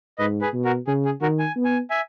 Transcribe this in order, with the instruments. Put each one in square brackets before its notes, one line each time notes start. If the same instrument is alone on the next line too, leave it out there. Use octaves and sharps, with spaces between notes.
[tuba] G#2 [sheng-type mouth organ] B4 D#5
[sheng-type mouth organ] G#4 B4
[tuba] B2
[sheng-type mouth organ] F#4 A#4
[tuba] C#3 [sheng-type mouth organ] G#4
[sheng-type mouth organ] G#4
[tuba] D#3 [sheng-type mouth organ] F#4 A#4
[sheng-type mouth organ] G#5
[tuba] B3
[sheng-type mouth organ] G#5
E5 G#5